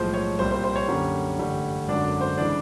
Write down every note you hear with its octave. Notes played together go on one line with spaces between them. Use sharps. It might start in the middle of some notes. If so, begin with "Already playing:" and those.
Already playing: B1 A2 F3 G#3 C5
C#5
C2 A#2 G3 C5
C5
C5
C#5
F#2 D3 G3 A#3 C#4
A1 G2 D3 G3
G#1 F#2 D3 F#3 D4 D5
C5
C#3 E3 G#3 D4 D5